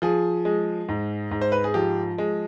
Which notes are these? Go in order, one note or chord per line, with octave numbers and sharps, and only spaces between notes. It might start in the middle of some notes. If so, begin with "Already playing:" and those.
F3 G#4
G#3
G#2
G#2
C5
B4
G#4
F3 G4
G#3